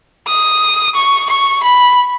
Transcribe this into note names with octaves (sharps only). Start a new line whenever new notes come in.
D#6
C#6
C#6
B5